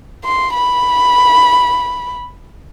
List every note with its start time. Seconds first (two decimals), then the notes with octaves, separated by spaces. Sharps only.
0.25 C6
0.55 B5